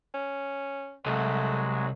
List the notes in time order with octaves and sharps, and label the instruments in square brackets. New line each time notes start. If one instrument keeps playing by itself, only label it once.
[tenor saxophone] C#4
[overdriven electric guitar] C2 [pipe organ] F#3 G#3 [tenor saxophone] A3